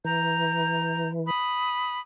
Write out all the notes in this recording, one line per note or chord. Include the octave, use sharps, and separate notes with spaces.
E3 A#5 G6
B5 D#6